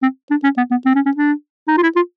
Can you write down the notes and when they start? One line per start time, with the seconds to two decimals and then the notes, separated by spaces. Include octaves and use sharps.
0.03 C4
0.31 D4
0.44 C#4
0.58 B3
0.71 B3
0.86 C4
0.95 C#4
1.06 C#4
1.17 D4
1.68 D#4
1.78 F4
1.83 E4
1.96 F4